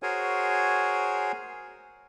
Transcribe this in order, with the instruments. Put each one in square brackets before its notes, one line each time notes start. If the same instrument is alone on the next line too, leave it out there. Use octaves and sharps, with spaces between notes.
[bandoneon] F#4 G#4 A#4 C5 C#5 G#5